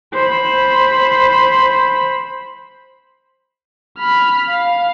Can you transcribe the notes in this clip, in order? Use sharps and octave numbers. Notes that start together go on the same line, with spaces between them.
C5 B5
B5 F6
F5